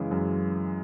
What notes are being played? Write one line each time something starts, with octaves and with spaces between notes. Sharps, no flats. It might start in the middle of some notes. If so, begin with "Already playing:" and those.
Already playing: F#2 C#3 E3 G#3
F#2